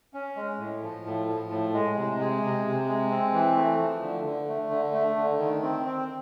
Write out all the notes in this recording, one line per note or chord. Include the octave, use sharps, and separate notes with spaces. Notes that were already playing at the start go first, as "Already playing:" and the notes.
C#4
G#3
A2
F3
A2
F3
A2
G#3
C3
G#3
C3
C3
G#3
C4
E3
A3
F3
D3
D3
A3
D3
A3
D3
D#3
C4
C4